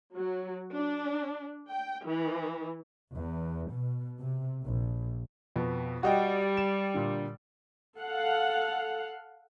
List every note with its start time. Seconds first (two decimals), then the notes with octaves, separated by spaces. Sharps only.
0.13 F#3
0.72 D4
1.68 G5
2.05 E3
3.15 E2
3.73 B2
4.20 C3
4.63 A#1
5.56 F2 B2
6.03 G3 F#4 D#5 G5
6.57 E7
6.94 A#2 D3
7.98 A4 F5 F#5